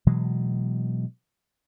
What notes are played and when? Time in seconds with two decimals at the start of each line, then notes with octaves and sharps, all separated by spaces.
0.06 B2 E3 F#3 G#3